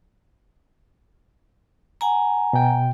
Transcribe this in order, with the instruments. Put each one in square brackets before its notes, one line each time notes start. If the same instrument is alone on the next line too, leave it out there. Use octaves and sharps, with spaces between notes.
[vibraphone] F#5 G#5 A#5
[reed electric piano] B2 G5